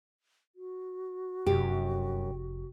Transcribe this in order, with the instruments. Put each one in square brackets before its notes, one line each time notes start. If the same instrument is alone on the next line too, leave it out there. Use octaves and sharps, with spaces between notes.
[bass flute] F#4
[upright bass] F1 [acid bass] F#2 [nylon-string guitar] G4